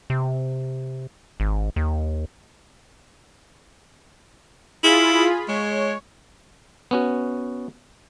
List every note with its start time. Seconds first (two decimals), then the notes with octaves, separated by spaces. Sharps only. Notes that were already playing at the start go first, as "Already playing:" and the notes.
0.10 C3
1.40 G#1
1.76 D#2
4.84 E4 F4 G#4 B5
5.48 G#3 C#5
6.91 B3 C#4 F#4